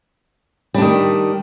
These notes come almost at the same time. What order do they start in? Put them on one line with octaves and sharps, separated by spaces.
G3 D4 D#3